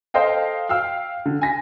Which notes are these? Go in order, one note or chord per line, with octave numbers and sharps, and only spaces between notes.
A4 C5 D#5 F5 G5
F5 G5 E6 F6
D3
G#5 A#6 B6